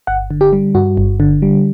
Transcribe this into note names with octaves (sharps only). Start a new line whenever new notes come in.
G1 F#5
D3
G4
G3
G2 F#4
G1
D3
G3